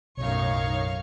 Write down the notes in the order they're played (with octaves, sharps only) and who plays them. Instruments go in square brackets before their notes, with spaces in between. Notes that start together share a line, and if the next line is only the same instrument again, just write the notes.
[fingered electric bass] B1 [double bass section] F#2 A2 [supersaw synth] D#4 C#5 [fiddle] F5 C#6